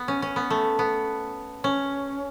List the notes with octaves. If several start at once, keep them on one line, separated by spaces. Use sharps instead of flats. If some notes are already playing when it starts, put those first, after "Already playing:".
Already playing: B3
C#4
C#4
B3
A3
B3
C#4